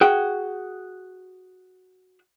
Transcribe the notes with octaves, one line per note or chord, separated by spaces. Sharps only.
F#4 G#4 G5